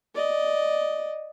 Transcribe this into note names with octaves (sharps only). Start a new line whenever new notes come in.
D5 D#5